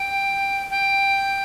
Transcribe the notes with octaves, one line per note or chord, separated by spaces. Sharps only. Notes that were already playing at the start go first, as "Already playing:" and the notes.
Already playing: G5
G5